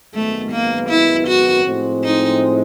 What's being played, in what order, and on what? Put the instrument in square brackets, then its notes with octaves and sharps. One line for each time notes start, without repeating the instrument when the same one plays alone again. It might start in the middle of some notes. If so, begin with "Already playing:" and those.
[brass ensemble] G#1 F#2 D#3 G#3 B3 [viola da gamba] A3
[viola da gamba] A#3
E4
F#4
[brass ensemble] A2 F3 G#3 C4
[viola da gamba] D#4